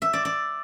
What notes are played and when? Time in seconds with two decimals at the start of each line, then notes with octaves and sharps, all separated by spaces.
0.02 E5
0.13 D5
0.25 D5